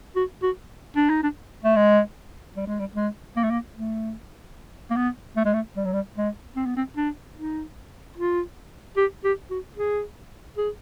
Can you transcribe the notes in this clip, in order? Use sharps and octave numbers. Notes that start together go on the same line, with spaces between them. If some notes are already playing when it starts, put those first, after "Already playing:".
F#4
F#4
D4
D#4
D4
A3
G#3
G3
G#3
G3
G#3
A#3
A3
A#3
A3
A#3
B3
A3
G#3
A3
G3
F#3
G3
G#3
C4
B3
C4
D4
D#4
F4
G4
G4
F#4
G#4
G#4